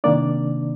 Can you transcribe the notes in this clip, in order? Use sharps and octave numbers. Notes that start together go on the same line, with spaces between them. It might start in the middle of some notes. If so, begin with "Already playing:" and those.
C3 D#3 A#3 D4 D5